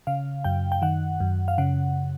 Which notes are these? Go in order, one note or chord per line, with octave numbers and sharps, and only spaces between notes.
C#3 F5
F#2 G5
G5
D#3 F#5
F#2
F5
C#3 F#5